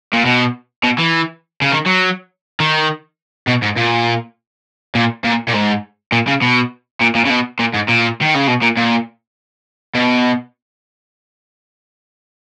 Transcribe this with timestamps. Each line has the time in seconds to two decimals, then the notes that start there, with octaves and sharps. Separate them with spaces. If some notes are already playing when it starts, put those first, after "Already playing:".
0.13 A#2
0.25 B2
0.84 B2
0.98 E3
1.62 C#3
1.72 D#3
1.86 F#3
2.60 D#3
3.48 B2
3.63 G#2
3.77 A#2
4.95 A#2
5.24 A#2
5.48 A#2
5.54 G#2
6.12 A#2
6.27 C#3
6.42 B2
7.01 A#2
7.15 A#2
7.26 C#3
7.30 B2
7.59 A#2
7.74 G#2
7.88 A#2
8.21 D#3
8.34 C#3
8.47 B2
8.62 A#2
8.77 A#2
9.95 B2